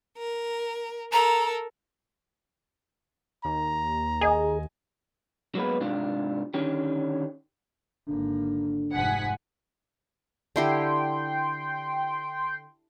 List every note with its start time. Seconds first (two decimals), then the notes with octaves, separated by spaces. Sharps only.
0.18 A#4
1.13 A4 A#4 A#5
3.45 D#2 A#5
4.21 G#4 D#5 G#5
5.55 F#3 G#3 A#3 B3 B4
5.81 G#2 C3 D4 F4
6.54 D3 D#3 C#4 G4
8.08 G#1 D3 A#3
8.93 F1 G#2 F#5 G#5 B6
10.56 D3 E4 G4 G5 C6